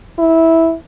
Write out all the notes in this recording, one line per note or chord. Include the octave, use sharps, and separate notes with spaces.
E4